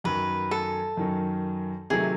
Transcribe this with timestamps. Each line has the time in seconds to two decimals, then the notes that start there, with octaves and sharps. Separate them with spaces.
0.04 F#2 D#3 F#3 B4
0.51 A4
0.97 F#2 D#3 F#3
1.90 C3 D#3 F#3 A3 G#4